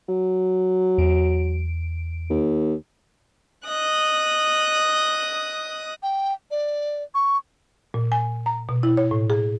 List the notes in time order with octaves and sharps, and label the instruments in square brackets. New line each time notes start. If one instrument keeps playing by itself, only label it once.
[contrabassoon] F#3
[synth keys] E2 D7
[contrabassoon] D#2
[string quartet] D#5 D#6 F#6
[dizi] G5
D5
C#6
[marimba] A#2
G#5
A#5
B2
E4
C#5
A2
G#4